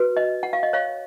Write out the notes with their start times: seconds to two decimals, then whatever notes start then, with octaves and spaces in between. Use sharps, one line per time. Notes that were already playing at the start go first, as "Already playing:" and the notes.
Already playing: F#4 B4
0.17 D#5
0.43 F#5
0.53 F5
0.63 D#5
0.73 C#5 F5